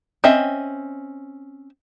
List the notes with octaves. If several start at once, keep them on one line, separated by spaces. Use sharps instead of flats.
C4 C#4 D#5 E5